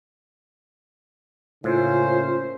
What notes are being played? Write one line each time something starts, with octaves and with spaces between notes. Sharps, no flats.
A2 C#3 A#3 C#4 F4 C5